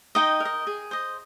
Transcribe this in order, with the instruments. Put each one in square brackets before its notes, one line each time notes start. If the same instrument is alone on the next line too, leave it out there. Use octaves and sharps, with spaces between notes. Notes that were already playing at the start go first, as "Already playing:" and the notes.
[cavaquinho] D#4 D#5 G5
A#4
D#5
G#4
C5 D#5